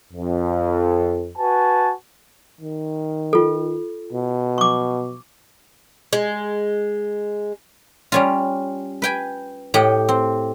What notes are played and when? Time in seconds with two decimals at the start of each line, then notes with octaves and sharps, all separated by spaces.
0.12 F2
1.37 F#4 B4 G#5 A5
2.61 D#3
3.33 F4 A4
4.13 B2
4.58 C#6 D6
6.13 G#3
8.12 G3 C#4 F4
9.02 B4 G5 G#5
9.74 A2 G4 D#5 F#5
10.09 C4